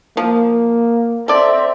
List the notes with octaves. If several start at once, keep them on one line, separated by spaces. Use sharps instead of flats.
F3 A#3
C4 A4 D5 E5